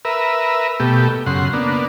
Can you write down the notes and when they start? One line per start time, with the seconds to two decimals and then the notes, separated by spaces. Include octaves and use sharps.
0.05 A#4 B4 E5
0.80 B2 A3 G4
1.26 F#2 C#3 F#5 C6
1.53 A#3 B3 D4